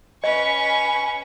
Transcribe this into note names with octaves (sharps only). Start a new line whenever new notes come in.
C#4 B4 D#5 G#5 C#6